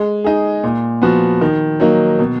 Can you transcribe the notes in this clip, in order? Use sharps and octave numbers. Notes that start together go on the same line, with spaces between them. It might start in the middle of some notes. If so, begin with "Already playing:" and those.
Already playing: G#3
D#4 G#4
A#2
F3 B3 F#4
D#3
F#3 A#3 D#4
B2